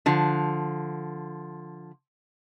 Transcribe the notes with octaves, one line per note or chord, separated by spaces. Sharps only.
D3 F3